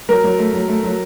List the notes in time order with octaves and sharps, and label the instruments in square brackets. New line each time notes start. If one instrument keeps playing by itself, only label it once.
[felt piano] F#3 [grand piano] A#4
[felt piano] F#3
A3
F#3
A3
F#3